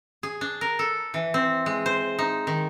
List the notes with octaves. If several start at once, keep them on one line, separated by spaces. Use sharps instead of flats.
G#4
D4
A#4
A4
E3
C4
G#3
C5
D#4
D#3